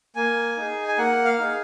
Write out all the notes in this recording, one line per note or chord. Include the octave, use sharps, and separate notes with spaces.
A#3 G#5
D#4 G#4
G#5
A#3 F#5
F5
D#4 G#4